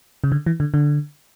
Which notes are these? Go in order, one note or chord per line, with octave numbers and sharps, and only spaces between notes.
C#3
D3
E3
D3
D3